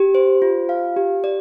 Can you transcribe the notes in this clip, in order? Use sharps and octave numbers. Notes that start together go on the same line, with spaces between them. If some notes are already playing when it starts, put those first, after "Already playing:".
Already playing: G4
C5
F4
F5
G4
D5